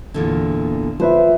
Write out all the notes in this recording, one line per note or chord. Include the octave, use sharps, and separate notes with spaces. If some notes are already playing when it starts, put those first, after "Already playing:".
E2 A#2 D3
F3 B4 C5 E5